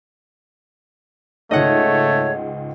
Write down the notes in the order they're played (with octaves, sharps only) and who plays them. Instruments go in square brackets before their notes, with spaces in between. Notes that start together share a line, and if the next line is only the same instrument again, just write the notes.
[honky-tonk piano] C#2 G#2 [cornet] A3 [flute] C#5 [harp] D#5 F#5